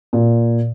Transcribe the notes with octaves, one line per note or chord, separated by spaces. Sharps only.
A#2